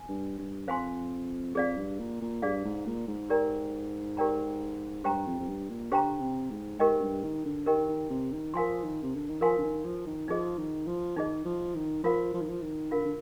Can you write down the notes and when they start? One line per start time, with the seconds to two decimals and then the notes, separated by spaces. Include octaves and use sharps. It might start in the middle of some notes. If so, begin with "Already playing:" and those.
Already playing: G#5
0.08 G2
0.38 G2
0.67 F2 C5 F5 G#5 C6
1.54 F2 G#4 D5 F5
1.77 G2
1.99 A#2
2.21 A#2
2.42 G2 G#4 D5 F5
2.64 G#2
2.86 A#2
3.07 G#2
3.30 G4 A#4 D5 G5 A#5
4.17 G4 A#4 D5 G5 A#5
5.04 G2 G4 C5 G5 A#5
5.26 F2
5.40 F2
5.48 G2
5.69 A#2
5.92 D3 G4 C5 G5 A#5
6.20 C3
6.50 G#2
6.79 G#2 G4 A#4 D#5 G5
7.01 G2
7.23 D#3
7.45 D3
7.66 D#3 G4 A#4 D#5 G5
7.89 D#3
8.10 C3
8.32 D#3
8.54 F3 A#4 F5 G#5 C6
8.83 D#3
9.02 C3
9.15 D3
9.28 D#3
9.41 F3 A#4 F5 G#5 C6
9.58 D3
9.63 D#3
9.84 F3
10.06 D#3
10.28 F3 D#4 G#4 D#5
10.58 D#3
10.87 F3
11.16 D#3 D#4 G#4 D#5
11.45 F3
11.75 D#3
12.03 F3 F4 A#4 F5
12.33 F3
12.41 D#3
12.49 F3
12.62 D#3
12.91 D3 F4 A#4 F5
13.04 D3